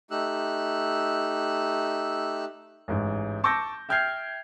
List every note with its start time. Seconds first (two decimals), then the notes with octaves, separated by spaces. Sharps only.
0.11 A3 D#4 G4 E6 F#6
2.88 A1 G#2
3.44 A5 C#6 D6 E6 G6 A#6
3.89 E5 G5 F6 G6 G#6 C7